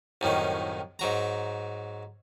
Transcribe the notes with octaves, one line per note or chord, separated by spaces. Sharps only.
C2 F#2 A2 D#3
G#2 F#3 A#5